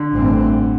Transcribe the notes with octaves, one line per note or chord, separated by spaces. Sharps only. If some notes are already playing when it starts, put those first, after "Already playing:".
Already playing: D3
A1 G2 E3 A3 C4